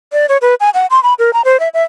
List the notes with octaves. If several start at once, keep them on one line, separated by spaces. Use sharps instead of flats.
D5
C#5
B4
G#5
F#5
C6
B5
A#4
A#5
C5
E5
E5